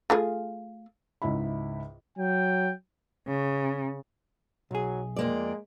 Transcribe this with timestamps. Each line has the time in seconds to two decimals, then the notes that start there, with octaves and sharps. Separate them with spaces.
0.10 A3 F4 G#4
1.22 C#2 G#2 E4 E5 B5
2.18 F#3 G5
3.27 C#3
4.71 B1 F#3 G#4
5.16 F2 G#3 A#3 D5